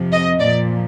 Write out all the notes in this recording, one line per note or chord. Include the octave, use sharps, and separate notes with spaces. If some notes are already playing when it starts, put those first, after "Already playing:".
Already playing: F2 C3 F3
D#5
A#2 F3 D5